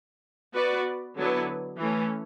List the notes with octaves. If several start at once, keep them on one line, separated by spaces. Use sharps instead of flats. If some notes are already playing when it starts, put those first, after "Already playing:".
B3 F#4 B4 D5
D3 F#3 B3 E4 B4
E3 A3 C#4